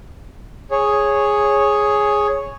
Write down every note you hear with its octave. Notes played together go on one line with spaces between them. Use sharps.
G#4 C#5